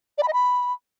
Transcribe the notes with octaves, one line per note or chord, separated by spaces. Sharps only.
D5
B5
D#5
B5